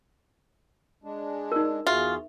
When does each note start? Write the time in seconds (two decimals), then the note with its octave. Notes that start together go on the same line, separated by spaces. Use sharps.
1.04 G#3 D4
1.52 D#4 A#4
1.87 E2 F4 F#4 G#4 E5